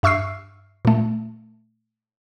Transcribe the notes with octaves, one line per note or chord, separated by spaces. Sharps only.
G2 E5 C#6 E6 F6 C7
A#2 A3